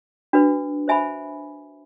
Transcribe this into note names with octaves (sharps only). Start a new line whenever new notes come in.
D4 F#4 B4
C5 E5 G#5 B5